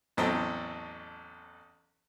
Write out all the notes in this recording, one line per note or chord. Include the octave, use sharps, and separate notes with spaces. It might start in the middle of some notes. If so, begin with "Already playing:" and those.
A1 E2 F#3 C4 A4 D#5